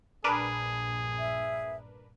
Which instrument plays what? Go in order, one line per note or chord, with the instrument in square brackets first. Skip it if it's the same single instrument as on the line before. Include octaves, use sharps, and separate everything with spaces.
[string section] A#1 G2 [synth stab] D4 A#4 B4 [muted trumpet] G#4
[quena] E5